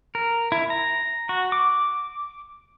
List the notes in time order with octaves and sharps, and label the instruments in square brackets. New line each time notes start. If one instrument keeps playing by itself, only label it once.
[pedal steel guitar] A#4
E4
A#5
F#4
D6